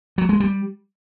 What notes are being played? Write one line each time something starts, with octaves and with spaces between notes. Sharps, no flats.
F#3
G#3
G3